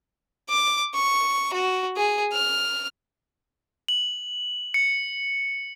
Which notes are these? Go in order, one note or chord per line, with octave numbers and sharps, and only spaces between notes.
D6
C#6
F#4
G#4
F6
F#7
C#7